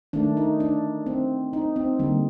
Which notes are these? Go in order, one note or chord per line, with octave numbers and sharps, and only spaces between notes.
D#3 A3 D4
D#4
D4
C4
D#4
C4
D3 G3 A#3